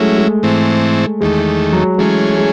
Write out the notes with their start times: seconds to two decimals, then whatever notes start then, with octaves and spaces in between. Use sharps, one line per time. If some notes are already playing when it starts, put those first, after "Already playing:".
Already playing: F#3 G#3 A3 C#4 E4
0.18 G#3
0.43 G#2 E3 A3 C4
1.21 E2 D#3 G#3 A3
1.72 F#3
1.98 E3 G#3 A3 C#4 G#4
2.37 G#3